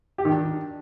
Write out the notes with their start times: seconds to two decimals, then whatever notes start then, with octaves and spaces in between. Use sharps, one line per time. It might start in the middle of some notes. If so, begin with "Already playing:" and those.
0.18 G4
0.25 D#3
0.32 D4